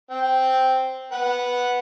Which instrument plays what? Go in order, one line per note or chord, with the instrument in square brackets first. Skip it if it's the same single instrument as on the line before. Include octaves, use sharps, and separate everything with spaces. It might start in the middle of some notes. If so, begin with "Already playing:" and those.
[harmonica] C4 G5
B4 F#5